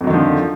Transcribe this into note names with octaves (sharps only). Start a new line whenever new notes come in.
F2 D3 D#3 F3 F#3